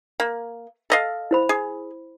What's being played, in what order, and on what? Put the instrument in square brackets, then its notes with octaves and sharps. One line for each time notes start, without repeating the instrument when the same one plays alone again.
[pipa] A#3
A4 D#5 F5
[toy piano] E4 C5 B5
[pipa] G#4